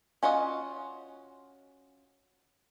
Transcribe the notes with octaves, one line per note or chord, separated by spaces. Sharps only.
C#4 F4 F#4 D#5